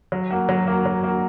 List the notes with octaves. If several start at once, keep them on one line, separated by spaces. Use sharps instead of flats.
F#3
A#3 F#4
F#3
A#3 F#4
F#3
A#3 F#4